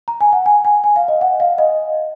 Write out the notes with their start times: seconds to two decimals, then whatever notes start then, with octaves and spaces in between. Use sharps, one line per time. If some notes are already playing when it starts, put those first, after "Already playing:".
0.08 A#5
0.21 G#5
0.33 F#5
0.46 G#5
0.65 G#5
0.84 G#5
0.96 F5
1.08 D#5
1.21 F#5
1.40 F5
1.58 D#5